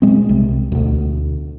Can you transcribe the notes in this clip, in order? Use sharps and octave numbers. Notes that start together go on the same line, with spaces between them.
A#2 G#3 C4
C2 C3
D2 B2